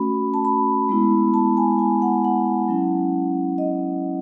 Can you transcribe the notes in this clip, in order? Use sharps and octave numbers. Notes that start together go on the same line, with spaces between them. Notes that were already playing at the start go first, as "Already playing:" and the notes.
Already playing: A3 C#4 F#4 B5
A5
B5
G#3 B3 E4
A5
G#5
G#5
F#5
F#5
F#3 C#4 E4
D#5